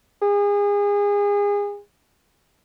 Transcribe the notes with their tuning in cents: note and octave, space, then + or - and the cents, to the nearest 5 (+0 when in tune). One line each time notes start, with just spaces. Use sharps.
G#4 -30